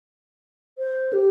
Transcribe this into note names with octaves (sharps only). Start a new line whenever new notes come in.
C5
G4